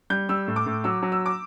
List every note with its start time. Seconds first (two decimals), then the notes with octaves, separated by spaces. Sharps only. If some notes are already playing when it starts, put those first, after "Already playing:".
0.10 G3 G6
0.29 G3 E6
0.48 A2
0.56 D6
0.66 A2
0.84 F#3 E6
1.02 F#3
1.12 E6
1.26 D6